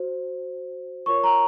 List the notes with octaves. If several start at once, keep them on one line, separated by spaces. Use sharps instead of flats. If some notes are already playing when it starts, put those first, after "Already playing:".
Already playing: F#4 C5
F4 A#4 C#5 C#6
A#5